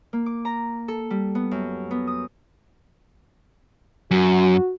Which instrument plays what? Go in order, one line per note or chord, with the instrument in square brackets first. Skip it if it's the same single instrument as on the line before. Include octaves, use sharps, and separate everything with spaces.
[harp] A#3
D6
A#5
A4
G3
B3
F#2
B3
D#6
[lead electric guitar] F#2 [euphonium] F#4